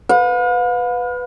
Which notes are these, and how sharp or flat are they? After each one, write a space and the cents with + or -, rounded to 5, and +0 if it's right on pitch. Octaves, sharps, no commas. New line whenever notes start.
B4 +10 F5 +45